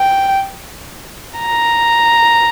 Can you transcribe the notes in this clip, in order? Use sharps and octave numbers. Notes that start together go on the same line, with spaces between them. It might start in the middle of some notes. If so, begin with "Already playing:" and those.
Already playing: G5
A#5